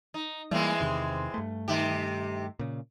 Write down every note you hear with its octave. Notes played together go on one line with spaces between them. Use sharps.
D#4
E3 G3 G#3 A#3 C4
E2 C3 D#3
G2 A3
C3 D#3 G4
A#2 C#3